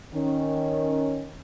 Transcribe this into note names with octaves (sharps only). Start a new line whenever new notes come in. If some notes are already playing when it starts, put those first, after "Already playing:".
D#3 C#4